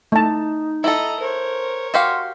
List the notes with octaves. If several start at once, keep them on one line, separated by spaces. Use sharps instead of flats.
A3 D#4 A5
E4 A4 D#5 A#5
A#4 C5 C#5
F#4 G4 F5 C6